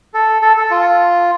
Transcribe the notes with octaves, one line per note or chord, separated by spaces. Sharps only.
A4
A4
A4
F4